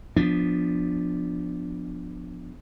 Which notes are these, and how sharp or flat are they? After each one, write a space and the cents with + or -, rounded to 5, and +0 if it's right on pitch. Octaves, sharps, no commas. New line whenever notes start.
F3 +5 B3 +0 D4 +0